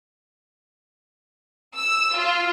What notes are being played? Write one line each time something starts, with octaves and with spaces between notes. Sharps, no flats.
E6
F4